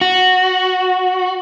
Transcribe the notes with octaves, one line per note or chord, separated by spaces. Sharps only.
F#4